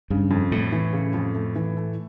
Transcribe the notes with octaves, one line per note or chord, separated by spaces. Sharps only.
G2 C#3
F2
A2 A3
E3
C#3
F2
A3
E3
A3